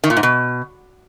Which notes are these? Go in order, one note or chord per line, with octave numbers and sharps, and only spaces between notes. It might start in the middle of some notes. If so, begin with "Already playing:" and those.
D#3
A#2
G#2
B2